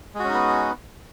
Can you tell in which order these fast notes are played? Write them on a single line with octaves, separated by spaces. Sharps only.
G#3 F#4 C#4 D#4 B3